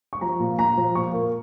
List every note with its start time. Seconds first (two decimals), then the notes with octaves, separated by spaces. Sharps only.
0.13 C#6
0.21 F3 A#5
0.40 A#2
0.58 A#2 A#5
0.77 F3
0.95 A#2 C#6
1.13 A#3